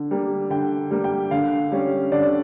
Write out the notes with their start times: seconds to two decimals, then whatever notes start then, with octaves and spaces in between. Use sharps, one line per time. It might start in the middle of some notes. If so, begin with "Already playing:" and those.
Already playing: D3
0.11 G3 A#3
0.50 D3 G5
0.91 G3 A#3
1.04 G5
1.31 D3 F5
1.72 G3 C#4
2.12 D3 D5